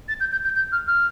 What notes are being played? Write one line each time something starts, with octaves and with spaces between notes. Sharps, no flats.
A6
G6
G6
G6
G6
F6
F6